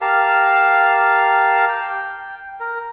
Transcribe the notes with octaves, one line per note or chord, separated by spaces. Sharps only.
G4 A#4 F5 A5
G5
A#4